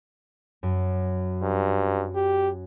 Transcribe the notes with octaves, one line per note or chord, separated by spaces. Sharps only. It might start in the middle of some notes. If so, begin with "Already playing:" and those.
F#2
G2
G4